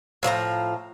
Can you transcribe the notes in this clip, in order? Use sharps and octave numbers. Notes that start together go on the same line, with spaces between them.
A2 F3 G#4 A#5